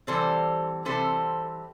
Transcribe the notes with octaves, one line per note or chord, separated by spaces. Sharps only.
C3 E3 G3 C4 A4 C5
C3 E3 G3 C4 A4 C5